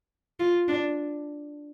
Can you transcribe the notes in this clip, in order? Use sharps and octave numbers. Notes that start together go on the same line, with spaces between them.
F4
D4